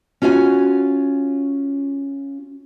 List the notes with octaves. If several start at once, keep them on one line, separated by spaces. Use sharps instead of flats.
C#4 F4 F#4 E5 G#5